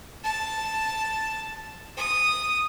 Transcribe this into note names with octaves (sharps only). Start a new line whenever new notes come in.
A5
D#6